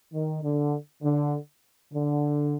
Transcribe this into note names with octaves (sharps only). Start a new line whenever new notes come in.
D#3
D3
D3
D3